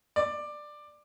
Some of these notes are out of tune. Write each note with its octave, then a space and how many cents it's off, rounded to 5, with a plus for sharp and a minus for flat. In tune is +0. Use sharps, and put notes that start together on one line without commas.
D5 +15